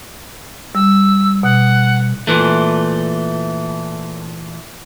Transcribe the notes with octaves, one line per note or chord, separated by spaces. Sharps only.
G3 E6
B2 F#5
A#2 E3 A3